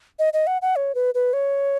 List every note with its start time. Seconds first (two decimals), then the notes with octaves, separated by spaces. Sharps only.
0.19 D#5
0.33 D#5
0.47 F#5
0.62 F#5
0.76 C#5
0.95 B4
1.15 B4
1.33 C#5